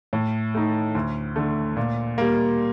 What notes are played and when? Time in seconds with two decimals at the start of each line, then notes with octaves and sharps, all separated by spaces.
0.13 A2
0.54 A3 D#4
0.95 D2
1.36 D3 A3
1.77 A#2
2.18 G3 A#3